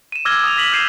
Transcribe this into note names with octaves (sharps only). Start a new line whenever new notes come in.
D#7 E7
D6 E6 F6 G#6 A#6 G7
D#6 F7
D#6 A#6 B6 F#7
E6 G6 G#6 C7 D#7 E7